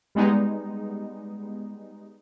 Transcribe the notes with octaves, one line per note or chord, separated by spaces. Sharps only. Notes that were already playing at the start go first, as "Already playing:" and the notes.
G3 G#3 B3 D#4